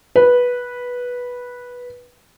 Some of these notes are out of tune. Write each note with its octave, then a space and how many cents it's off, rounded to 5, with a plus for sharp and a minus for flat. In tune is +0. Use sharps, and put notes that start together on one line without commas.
B4 -10